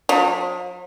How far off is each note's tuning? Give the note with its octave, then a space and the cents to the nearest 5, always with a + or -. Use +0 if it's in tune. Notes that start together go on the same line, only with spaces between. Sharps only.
F3 +45